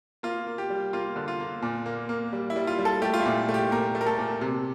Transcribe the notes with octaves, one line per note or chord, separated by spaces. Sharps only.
A#3 F4
A#3
G4
G3
A#3 F4
D3
F4
A#3
A#2
A#3
A#3
G3
E4
G3
F4
G3
A4
A3 G4
F4
E4
A#2
A3
G4
A#2 A#4
A3
A#4
A4
A#2
C3